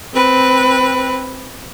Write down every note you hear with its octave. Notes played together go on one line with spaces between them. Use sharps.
C4 B4